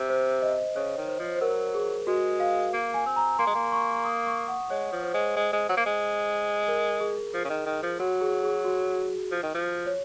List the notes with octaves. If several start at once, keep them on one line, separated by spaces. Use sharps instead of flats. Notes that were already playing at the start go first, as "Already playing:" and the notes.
Already playing: C3
C5
D#5
C#3 C#5
D#3
C5
F3
C5
F#3 A#4
G#4
G#3 F#4
F5
A#3
G#5
C4
A#5
A#3 C6
G#3
A#3
C#6
D#6
C#6
F#5
G#3 C#5
F3
C5
G#3
G#3
G#3
F#3
A#3
G#3
A#4
G#4
F3
C#3
D#3
D#3
F3
F#3 F#4
G#4
G#4
F#4
F3
D#3
F3
C#5